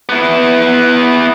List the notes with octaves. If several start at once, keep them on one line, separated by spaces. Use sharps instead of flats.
B3 E4